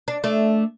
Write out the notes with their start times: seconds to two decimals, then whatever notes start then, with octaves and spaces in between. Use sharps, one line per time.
0.08 D4
0.24 A3 D4